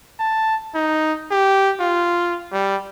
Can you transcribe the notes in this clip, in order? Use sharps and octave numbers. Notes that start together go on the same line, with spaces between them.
A5
D#4
G4
F4
G3